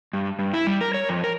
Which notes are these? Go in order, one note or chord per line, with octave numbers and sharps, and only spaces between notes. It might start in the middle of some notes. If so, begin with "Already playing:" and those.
G2
G2
E4
G3
A#4
C#5
F2
A#4